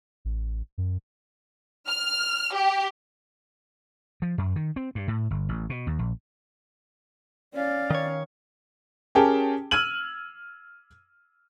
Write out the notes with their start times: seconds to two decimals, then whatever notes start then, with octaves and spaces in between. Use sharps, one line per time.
0.25 A1
0.78 F#2
1.87 F6
2.54 G4
4.22 F3
4.38 F#2
4.56 D#3
4.76 C4
4.95 G2
5.08 A2
5.30 G1
5.49 A1
5.70 B2
5.87 D#2
5.99 A#1
7.54 C#4 D5 F5
7.91 D#3 C#5
9.15 C#4 G4 G#4 A#4 G5 A5
9.71 E6 F6 G#6 D#7 F#7